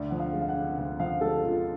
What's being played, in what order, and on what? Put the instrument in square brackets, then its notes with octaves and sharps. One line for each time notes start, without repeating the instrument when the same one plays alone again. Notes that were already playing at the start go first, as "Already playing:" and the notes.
Already playing: [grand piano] D2 [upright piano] D5
[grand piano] F3 [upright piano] F#5
[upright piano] F5
[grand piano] G#3
[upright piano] F5
F#5
[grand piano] D3
[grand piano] D2 [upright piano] F#5
[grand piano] F3 [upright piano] F5
[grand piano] G#3 [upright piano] A4
[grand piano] D3 [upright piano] F4